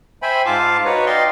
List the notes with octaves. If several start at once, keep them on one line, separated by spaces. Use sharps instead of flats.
C5 E5 G5 G#5 B5
G#2 F4 F5 A5 D6
D#4 F#4 B4 C#5
D5 D#5 F5 G5 C6